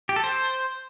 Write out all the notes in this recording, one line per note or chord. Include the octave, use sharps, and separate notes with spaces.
G4
A4
C5